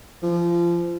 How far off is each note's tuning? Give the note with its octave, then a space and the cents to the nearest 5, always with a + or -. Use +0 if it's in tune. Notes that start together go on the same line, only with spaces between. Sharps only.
F3 -25